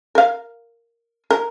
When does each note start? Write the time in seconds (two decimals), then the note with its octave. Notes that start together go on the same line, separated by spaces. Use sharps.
0.15 A#4 F5
1.31 A#4